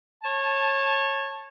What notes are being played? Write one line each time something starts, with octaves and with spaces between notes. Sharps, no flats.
C#5 A5